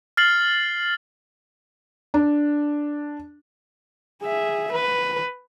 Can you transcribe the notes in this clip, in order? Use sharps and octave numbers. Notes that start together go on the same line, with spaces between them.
F6 A6 C7 F#7
D4
G#4 E5
B4